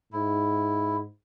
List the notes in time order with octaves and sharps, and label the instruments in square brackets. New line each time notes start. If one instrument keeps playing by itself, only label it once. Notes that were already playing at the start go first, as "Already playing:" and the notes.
[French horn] G#2 [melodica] E4